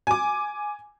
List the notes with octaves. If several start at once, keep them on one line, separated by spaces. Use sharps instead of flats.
G#5 D6